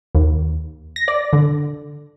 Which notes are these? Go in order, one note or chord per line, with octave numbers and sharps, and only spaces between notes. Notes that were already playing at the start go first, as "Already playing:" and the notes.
D#2
A#6
D5
D3